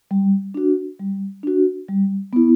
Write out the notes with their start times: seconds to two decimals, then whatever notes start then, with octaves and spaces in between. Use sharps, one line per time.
0.11 G3
0.54 D4 F#4
0.99 G3
1.43 D4 F#4
1.88 G3
2.33 B3 E4